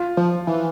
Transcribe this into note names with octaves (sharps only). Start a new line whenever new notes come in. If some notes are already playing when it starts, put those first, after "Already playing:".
Already playing: F4
F3
E3